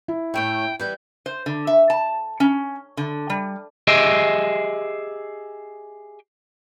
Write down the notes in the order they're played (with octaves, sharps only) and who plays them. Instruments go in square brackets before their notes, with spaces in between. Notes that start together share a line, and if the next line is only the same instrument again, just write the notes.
[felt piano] E4
[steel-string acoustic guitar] A2 A3 C#4 [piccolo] G5
[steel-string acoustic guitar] E3 G3 B3 [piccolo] G6
[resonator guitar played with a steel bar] C5
D3
E5
A5
C#4
D3
G3
[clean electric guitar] G4 G#4 D#5 E5